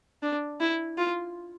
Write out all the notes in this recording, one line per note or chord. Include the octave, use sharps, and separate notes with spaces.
D4
E4
F4